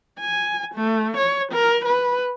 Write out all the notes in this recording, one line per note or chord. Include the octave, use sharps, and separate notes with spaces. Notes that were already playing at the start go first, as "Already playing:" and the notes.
G#5
A3
C#5
A#4
B4